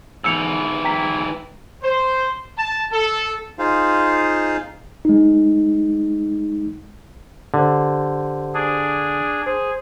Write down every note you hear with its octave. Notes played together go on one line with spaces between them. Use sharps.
G#2 E3 E6 C#7 F7
G5 A#5 B6
C5
A5
A4
D#4 F4 G#4 C5 F5
G#3 D#4
D3 G4 C5
D4 G#4
G#4 C5